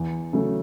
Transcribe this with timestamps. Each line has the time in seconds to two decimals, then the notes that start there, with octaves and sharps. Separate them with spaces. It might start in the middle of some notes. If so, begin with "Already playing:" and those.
Already playing: E2
0.33 C#3 F#3 A3